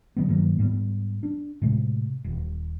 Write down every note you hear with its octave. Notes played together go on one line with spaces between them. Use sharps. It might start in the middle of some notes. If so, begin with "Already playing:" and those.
D3 F#3 B3
G2 D#3 F#3 A#3
G#2 G3 A#3 B3
D4
A2 C3 G#3
D#1